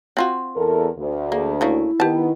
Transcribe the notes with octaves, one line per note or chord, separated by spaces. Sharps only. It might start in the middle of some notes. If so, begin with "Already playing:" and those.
C4 F4 F#4
E2 A4 A#4
D2
A#3 G#4
C#3 A3 A#3 E4
D#3 B3 G4 A5